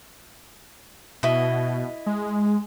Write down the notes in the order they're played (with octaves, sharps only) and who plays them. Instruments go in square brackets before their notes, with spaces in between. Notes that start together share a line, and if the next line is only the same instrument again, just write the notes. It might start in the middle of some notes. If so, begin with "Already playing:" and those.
[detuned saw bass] B2 [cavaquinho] E4 D#5
[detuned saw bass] G#3